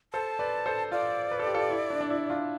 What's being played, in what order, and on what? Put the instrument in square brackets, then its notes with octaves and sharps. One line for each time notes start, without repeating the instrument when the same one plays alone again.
[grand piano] A4 C5 [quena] A5
[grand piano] B4 D5
A4 C5
[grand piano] F4 A4 [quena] D5
[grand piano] B4
A4
G4
F4 A4
E4
D4
D4
E4
D4 F4